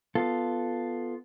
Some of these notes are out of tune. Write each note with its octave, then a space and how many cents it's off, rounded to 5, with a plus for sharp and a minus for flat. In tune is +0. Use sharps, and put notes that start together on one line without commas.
B3 +0 F4 +0 A4 +0